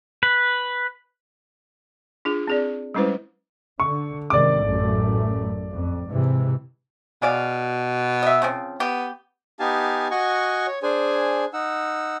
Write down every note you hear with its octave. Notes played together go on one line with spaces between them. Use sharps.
B4
D4 F4 G#4
C4 G#4 D5
G3 G#3 C#4 E4 B4 C5
D3 C#6
G#2 C3 D#3 D5 D6
A1 F#2 A3
F2
G#2 C3 E3
B2 G#4 D5 F5
D#5 E5
C#3 F3 C4
B3 G4
B3 D#4 G4 F5 G#5 A5
F#4 D#5 F#5 G#5 C#6
C#5
D4 G#4 C5 G#5
D#4 F#5 E6